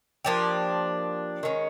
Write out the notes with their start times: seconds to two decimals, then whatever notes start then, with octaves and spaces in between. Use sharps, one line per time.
0.25 F3 A#3 D4 G4
1.43 D#3 G#3 C#4